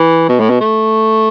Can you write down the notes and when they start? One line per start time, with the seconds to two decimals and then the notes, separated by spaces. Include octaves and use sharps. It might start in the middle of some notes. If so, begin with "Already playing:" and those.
Already playing: E3
0.29 B2
0.40 A2
0.50 B2
0.60 A3